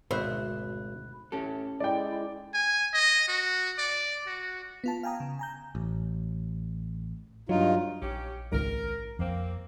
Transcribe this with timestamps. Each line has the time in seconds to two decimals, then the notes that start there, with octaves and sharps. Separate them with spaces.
0.11 G#1 D2 B2 C5 D#5 E5 B5 F#6
1.32 A2 C#4 G4 A4
1.80 G#3 E4 D5 G5
2.54 G#5
2.93 D#5
3.28 F#4
3.78 D5
4.27 F#4
4.84 B3 F4 A5
5.03 F5 G5 G#5 A#5 D#6
5.20 C#3
5.39 G#5 A#5 G6
5.75 A1
7.49 G2 F#3 D#4 F4
8.02 A#1 C#4 G4 C#7
8.52 G#1 C#2 A#4
9.19 F2 A#3 C4